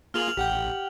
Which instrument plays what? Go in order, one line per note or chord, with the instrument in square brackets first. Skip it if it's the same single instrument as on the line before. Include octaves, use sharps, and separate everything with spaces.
[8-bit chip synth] A#3 F4 G#4 [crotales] F6 F7 F#7
[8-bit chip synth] A1 [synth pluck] G4 F#5 G5